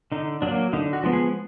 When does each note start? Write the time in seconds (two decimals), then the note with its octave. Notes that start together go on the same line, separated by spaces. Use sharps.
0.12 D3 D#4
0.42 F#3 A#3 D4
0.73 D3 D#4
0.93 F#4
1.03 F3 G#3 B3
1.13 G#4